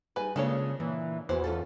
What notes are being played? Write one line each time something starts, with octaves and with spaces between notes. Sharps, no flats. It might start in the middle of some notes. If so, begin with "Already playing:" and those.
G3 D#4 G#4 B4 G#5
C#3 G#3 A#3 D4 F4 A4 C#5
A#2 E3
E2 E3 F#4 B4 C5
C#4 F4 A4